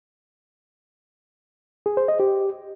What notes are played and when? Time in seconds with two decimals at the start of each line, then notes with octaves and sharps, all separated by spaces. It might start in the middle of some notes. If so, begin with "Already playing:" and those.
1.86 G#4
1.97 C5
2.08 D#5
2.20 G4